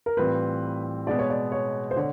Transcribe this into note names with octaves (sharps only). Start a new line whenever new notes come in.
A#4
A2 E3 G3 C4 F4 B4
B2 G#3 B3 D5
C#5
D5
C#5
C5
D3 C#5